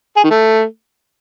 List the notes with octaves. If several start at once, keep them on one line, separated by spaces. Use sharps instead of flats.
G#4
D#3
A3